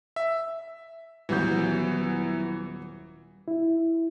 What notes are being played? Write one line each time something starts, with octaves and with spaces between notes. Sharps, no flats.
E5
D#1 E3 F#3 B3 G6
E4